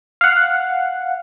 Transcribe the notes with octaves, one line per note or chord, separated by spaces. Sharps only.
F5 F#5